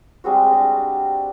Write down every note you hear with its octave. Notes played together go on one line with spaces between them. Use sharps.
G3 G#3 C4 F#4
D4 D#5 A5